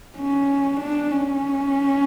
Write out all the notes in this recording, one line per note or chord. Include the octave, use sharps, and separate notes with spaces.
C#4
D4
C#4